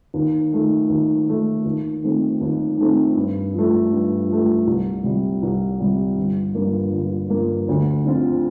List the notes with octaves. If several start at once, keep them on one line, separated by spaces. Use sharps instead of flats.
D#2
D#3 A3
D#2
D#3 A3
D#2
D#3 A3 C4
D#2
D#3 A3 C4
G2
F3 A3
G2
F3 A3
C2
C3 G3
C2
C3 G3
G1
G2 F3 A#3 F4
G1
G2 F3 A#3 F4
D2
D3 F3 C4 F4